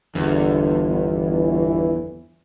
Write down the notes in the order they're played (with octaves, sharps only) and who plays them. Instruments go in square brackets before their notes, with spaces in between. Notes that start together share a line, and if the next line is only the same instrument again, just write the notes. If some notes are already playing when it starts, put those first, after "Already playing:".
[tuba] G1 [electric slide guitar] E2 [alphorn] D3
[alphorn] E3